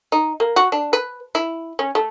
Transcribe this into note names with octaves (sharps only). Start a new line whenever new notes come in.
D#4
A#3
F#4
D4
B4
E4
C#4
A3